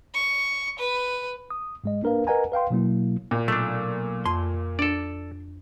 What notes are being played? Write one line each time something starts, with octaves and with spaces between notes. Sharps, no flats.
C#6
B4
D#6
G#2 G#3 D#5
A#3 D4 A#4 B4 F5
A#4 B4 D#5 F#5 G#5 A#5
B4 F5 G5 C6
B2 F#3 A#3 E4
A#2
B1 A3 D4
F2 C6
D4 A4 D5